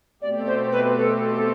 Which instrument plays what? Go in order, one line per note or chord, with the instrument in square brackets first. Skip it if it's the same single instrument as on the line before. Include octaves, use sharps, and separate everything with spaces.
[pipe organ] B2 A3 C4 G4 [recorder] D5
[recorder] C5
B4
A4
A4